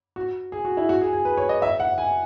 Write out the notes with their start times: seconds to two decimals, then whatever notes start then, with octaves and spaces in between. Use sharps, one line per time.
0.16 F#4
0.52 G#4
0.65 F#4
0.77 E4
0.89 F#4
1.01 G#4
1.13 G#4
1.25 B4
1.37 C#5
1.49 D#5
1.62 E5
1.80 F#5
1.98 G#5